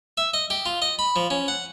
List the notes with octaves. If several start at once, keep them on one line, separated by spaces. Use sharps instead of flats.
E5
D#5
G4
F4
D#5
B5
F3
C#4
F#5